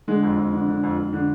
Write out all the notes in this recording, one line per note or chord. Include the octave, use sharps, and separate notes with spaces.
D3 G#3
F2
F2
D3
D3
F2
F2
D3